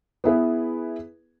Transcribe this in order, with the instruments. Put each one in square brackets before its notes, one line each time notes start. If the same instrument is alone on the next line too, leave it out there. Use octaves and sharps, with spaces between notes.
[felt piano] B3 E4 G#4 B4